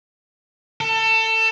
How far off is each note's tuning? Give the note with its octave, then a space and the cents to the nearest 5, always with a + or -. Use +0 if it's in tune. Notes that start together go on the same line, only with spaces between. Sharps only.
A4 +25